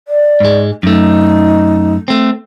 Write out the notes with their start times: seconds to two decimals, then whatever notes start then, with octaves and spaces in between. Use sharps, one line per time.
0.08 D5
0.40 G#2 G#3
0.83 F#2 A3 D#4
2.08 A3 C4